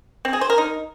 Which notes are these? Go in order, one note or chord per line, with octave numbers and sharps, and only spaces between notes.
C4
G#4
C5
A#4
D#4